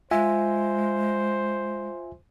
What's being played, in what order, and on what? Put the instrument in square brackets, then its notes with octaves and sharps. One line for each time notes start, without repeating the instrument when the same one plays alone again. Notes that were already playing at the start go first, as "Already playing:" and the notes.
[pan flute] G#3 [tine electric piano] F4 E5 G#5 [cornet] C5